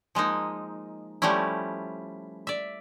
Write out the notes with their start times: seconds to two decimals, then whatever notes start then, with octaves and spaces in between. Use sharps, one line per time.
0.15 F3 G#3 A#3 D#4
1.22 F3 G3 A3 C#4 E4
2.47 D5 E5